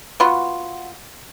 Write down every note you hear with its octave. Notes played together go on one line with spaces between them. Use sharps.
B3 F4 F#4